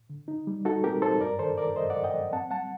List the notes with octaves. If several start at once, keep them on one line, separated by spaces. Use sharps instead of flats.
D3
D#4
G3
D#4 F#4 A4
C4 G4 A#4
D#4 A4 C5
G2 A#4 D5
D#3 A4 C5
D#3 A#4 D5
G2 C5 D#5
D5 F#5
G2
D#5 G5
F#3
C4 F#5 A5
G3 F#5 A5